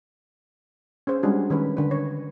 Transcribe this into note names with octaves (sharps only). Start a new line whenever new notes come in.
C#4 G#4 C5
G3 G#3 C#4 D4 F#4 G#4
D#3 C#4 B4
D3 B4
C#5